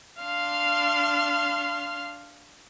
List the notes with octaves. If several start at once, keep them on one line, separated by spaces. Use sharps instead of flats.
D4 F5 C6 F6